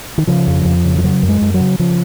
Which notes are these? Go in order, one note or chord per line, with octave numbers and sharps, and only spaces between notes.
D#3
C#3 F3
F2
F2
C#3
F3
C#3 F#3
F#2
G#3
F#2
F#3
C#3
C#3 F3